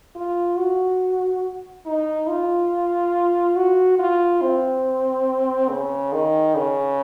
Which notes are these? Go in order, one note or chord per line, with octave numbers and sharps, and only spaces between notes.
F4
F#4
D#4
F4
F#4
F4
C4
C#3
D#3
C#3